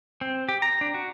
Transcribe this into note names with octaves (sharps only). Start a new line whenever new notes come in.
C4
G4
A#5
D4
F#4